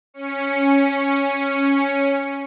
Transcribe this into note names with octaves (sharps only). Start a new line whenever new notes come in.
C#4 C#7